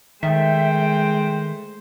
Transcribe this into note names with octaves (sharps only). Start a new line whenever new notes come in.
D#3 G#3 A3 C5 E5 G5